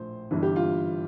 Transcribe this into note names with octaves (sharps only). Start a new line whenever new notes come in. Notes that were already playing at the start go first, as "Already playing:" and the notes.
Already playing: A#1 A2 F3 C5
G1 G2 E3
G4
F4